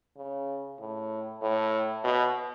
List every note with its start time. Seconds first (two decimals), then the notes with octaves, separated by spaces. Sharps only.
0.17 C#3
0.80 A2
1.42 A2
2.04 B2